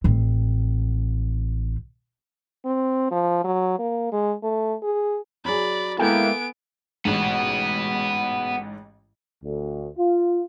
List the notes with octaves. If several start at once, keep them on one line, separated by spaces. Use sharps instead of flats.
A1 C4
C4
F3
F#3
A#3
G#3
A3
G#4
F#3 G#4 D5 B5
G#3 A#3 B3 E4 A4 G5 G#5 D7
A1 G#2 B3 F#4
D2
F4